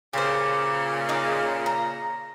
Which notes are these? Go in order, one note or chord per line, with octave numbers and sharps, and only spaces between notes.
A#2 C#3 G4 C5
D#4 D#5 D6
A#5